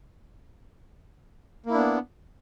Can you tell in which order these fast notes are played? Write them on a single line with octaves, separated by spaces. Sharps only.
A#3 E4 D4 B3